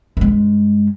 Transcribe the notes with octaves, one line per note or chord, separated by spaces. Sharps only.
G2 G#3